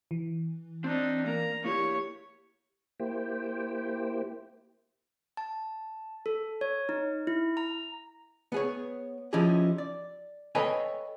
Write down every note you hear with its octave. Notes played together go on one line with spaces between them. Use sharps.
E3
C4 D4 D#4 G5
A#3 A#4 A#5
A#3 E4 G4 C#5
A#3 E4 G4 C5 G5
A5
A4
C#5
D#4
E4
A#5
B3 G#4 C#5
F3 C#4 D#4 E4 G4 G#4
D5
A4 B4 C#5 D#5 G5 G#5